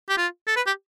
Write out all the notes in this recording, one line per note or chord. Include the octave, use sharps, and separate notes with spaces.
G4
F4
A4
B4
G4